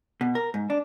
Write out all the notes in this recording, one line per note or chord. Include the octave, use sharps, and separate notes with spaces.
B2
A#4
G#2
D4